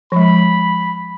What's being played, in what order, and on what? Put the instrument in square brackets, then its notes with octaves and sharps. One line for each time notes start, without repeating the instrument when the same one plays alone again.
[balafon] F3 G#3 [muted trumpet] B5